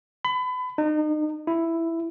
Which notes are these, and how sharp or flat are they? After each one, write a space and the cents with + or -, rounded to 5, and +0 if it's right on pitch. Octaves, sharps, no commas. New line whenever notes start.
B5 +30
D#4 -35
E4 +5